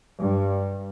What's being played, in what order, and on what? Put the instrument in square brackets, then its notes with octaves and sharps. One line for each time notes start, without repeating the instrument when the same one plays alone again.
[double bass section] G2